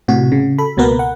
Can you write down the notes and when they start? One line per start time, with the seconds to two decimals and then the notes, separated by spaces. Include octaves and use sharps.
0.08 A2 C3 F#4
0.32 C#3
0.58 A4 B5
0.77 C#2 B2 A#3 B3 A#4 B4
0.99 F#5